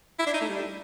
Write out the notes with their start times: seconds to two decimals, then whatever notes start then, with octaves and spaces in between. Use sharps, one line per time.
0.19 E4
0.26 D4
0.34 D#4
0.41 A3
0.48 G3